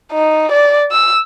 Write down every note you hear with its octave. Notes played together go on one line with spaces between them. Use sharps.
D#4
D5
E6